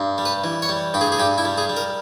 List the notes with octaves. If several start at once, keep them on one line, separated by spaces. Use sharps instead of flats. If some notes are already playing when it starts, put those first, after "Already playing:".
Already playing: G2
G3
B4
E3
C#5
G3
G2 G4
G#4
G#4
G2 G4
E4
G3
G#4
G3
A#4